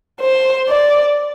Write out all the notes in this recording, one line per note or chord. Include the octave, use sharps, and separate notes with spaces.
C5
D5